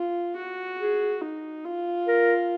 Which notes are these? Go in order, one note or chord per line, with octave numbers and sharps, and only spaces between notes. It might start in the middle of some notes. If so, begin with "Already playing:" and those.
Already playing: F4
F#4
G#4
D#4
F4
A#4